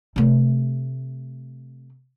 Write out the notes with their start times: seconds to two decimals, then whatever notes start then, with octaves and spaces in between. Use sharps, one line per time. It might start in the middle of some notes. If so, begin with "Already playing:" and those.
0.16 C3 A3